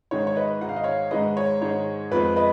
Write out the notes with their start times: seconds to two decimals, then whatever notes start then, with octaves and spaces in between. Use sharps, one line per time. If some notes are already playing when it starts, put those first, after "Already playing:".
0.11 G#2 D#3 G#3 C#5
0.27 C#5
0.36 B4 D#5
0.61 G#2 D#3 G#3 F#5
0.69 F5
0.76 D#5
0.84 C#5 F5
1.11 G#2 D#3 G#3 B4 D#5
1.37 C#5
1.61 G#2 D#3 G#3 C#5
2.11 F2 F3 G#3 B3 B4
2.36 B4 D#5